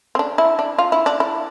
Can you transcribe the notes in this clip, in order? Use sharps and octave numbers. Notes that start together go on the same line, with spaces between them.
C4
D4
E4
D4
F4
E4
D4
E4